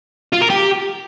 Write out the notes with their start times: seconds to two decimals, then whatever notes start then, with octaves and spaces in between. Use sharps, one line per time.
0.33 F4
0.41 A#4
0.50 G4